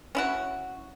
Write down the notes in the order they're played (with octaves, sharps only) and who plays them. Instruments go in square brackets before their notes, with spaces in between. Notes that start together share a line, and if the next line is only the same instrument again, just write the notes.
[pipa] C#4 E4 F#4